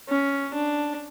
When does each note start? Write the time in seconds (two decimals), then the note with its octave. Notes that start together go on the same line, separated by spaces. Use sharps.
0.09 C#4
0.54 D4